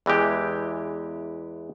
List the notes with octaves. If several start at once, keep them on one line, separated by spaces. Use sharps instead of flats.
E2 E3 G#3 G4